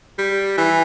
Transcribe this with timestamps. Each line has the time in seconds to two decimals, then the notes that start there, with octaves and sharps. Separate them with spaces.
0.18 G3
0.57 E3